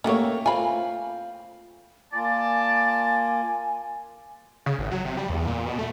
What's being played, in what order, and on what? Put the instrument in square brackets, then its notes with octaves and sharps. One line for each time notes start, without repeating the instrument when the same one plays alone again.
[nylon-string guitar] A3 A#3 C#5 [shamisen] C#4 F#4 G4
[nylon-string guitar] C4 F4 [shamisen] G#5 B5
[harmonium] A#3 F4 [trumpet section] D5 A5 [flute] G#5
[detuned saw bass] C#3
G#1
F#3
C3
G3
E2
A#2
B2
A3